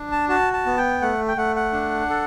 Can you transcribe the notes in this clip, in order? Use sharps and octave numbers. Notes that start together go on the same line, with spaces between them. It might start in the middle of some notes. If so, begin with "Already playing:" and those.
Already playing: D4
A5
F#4 A5
A5
B3
G5
A3 F#5
G5
A3 F#5
F#5
D4
A4